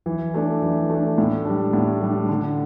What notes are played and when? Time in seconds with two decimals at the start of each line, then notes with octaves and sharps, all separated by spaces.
0.06 E3
0.34 A3 D4
0.62 E3
0.90 A3 D4
1.18 A2
1.45 G3 D4
1.73 A2
2.02 G3 D4
2.29 D3